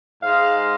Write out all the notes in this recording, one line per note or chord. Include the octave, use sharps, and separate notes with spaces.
G#2 G#3 F5